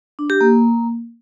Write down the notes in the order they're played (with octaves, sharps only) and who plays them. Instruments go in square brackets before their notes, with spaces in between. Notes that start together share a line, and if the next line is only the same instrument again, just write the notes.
[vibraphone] D4
G4
A#3